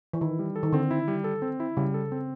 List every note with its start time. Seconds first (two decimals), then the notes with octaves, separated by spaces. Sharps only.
0.13 E3
0.21 D#3 E4
0.39 G3
0.56 A4
0.63 D#3
0.73 D3 C4
0.91 E4
1.08 G3
1.24 A4
1.42 C4
1.60 E4
1.77 C#3 G3
1.94 A4
2.12 C4